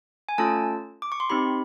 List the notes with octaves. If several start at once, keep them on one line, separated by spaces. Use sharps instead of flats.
G#5
A3 C#4 F4 A4 A5
D6
C#6
C6
C4 D#4 G4 B5